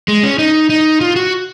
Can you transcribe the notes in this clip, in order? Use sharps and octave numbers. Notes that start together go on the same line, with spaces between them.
G#3
C#4
D#4
D#4
F4
F#4